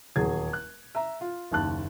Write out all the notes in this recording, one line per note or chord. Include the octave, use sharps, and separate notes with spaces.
D#1 E2 F#3 G#4 G#6
F#6
E5 A#5
F4
F#1 D#2 A5 F#6